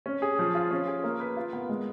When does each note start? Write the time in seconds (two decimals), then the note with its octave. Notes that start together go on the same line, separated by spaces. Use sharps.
0.06 C#4
0.22 G#4
0.39 F3
0.55 F4
0.71 C#4
0.87 G#4
1.04 A#3
1.20 B4
1.37 F4
1.53 B3
1.69 G#3